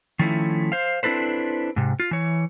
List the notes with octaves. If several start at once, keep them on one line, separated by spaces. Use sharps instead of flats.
D#3 F3 A3 C#4 E4
C5 F5
C4 D4 E4 A4 B4 C5
G#2 C3
F4
E3 C#5